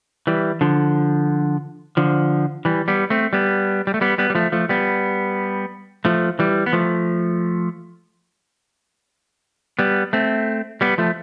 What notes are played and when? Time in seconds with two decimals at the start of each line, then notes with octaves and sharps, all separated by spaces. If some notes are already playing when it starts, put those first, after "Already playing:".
0.27 E3 G3
0.61 D3 F3
1.97 D3 F3
2.65 E3 G3
2.88 G3 B3
3.10 A3 C4
3.33 G3 B3
3.87 G3
3.94 A3
4.01 G3 B3
4.18 G3 B3
4.30 G3
4.35 F3 A3
4.52 F3 A3
4.69 G3 B3
6.05 F3 A3
6.39 E3 G3
6.66 B3
6.73 F3 A3
9.79 G3 B3
10.13 A3 C4
10.81 G3 B3
10.98 F3 A3